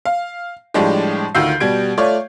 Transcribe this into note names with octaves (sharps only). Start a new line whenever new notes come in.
F5
A2 F3 G3 G#3 D4 G4
D2 D#3 F4 E6 G6 C7
B2 G3 G#6 D7
A3 F4 C#5 D5